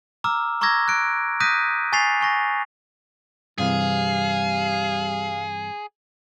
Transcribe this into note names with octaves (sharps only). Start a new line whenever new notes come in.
A#5 D6 E6 F6
A#5 C#6 D6 E6 G#6 A#6
F#6 D7
D#6 F#6 G6 A#6 B6 D#7
G#5 C#6 A6 B6 C7 F7
G#5 C#6 A#6
G2 C3 E3 G3 G#4 F5